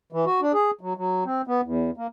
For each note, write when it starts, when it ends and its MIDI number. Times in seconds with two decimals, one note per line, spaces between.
0.13 0.25 52
0.26 0.40 66
0.41 0.52 62
0.53 0.71 68
0.81 0.93 54
0.97 1.24 54
1.25 1.42 60
1.47 1.61 59
1.63 1.91 40
1.97 2.07 58